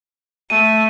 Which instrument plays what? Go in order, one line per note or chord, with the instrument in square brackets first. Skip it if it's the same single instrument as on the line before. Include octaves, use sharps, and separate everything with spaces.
[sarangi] A3 [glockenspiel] D#7